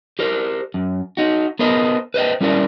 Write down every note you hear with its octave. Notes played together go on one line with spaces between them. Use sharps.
G4 A#4 C5
F#2
D#4 F#4
B3 A#4 C5 D#5
B4 C5 D#5 G5
G3 C#4 E4 A#4 D5